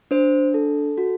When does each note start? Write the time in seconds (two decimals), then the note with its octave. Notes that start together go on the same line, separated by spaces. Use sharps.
0.11 D4 C5
0.54 A4
0.98 F#4